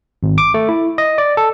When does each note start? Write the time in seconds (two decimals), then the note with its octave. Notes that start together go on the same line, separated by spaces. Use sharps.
0.23 G#1
0.38 D6
0.54 A3
0.69 E4
0.98 D#5
1.18 D5
1.37 A4